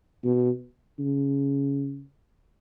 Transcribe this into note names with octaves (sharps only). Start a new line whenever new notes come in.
B2
C#3